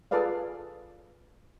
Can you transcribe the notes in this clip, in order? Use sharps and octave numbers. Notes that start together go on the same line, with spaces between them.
F4 G#4 A4 B4 D5 F5